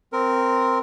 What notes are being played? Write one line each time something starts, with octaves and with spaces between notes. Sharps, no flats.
C4 A#4